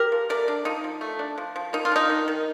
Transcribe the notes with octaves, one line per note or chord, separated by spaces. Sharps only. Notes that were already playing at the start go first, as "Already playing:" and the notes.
Already playing: G4 A#4
F3
A3 A#4 D5
D4
F3 D#4
F3
A3
D4
F3
F3
A#3 D#4
F4
D4 D#4
D#3
D#3